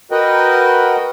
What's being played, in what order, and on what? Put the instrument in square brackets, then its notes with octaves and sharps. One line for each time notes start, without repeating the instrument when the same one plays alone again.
[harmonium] F#4 A#4 B4 D#5 F#5 G5